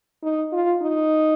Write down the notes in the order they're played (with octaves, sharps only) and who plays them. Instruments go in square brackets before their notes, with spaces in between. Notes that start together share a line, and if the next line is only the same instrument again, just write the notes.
[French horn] D#4
F4
D#4